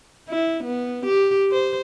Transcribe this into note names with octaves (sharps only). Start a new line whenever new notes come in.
E4
B3
G4
C5